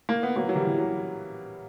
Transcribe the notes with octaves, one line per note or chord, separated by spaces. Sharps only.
A#3
B3
F#3 A#3
F#3
E3 G3
E3
F#3